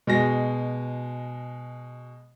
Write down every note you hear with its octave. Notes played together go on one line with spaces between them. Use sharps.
B2 G#3 A#6